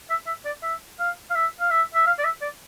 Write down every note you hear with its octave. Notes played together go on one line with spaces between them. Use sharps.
E5
E5
D5
E5
F5
F5
E5
F5
E5
E5
F5
D5
E5
D5